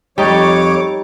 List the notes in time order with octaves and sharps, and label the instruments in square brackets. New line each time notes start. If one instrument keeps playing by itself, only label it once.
[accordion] F2 C#5 D6 [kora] G3 D#4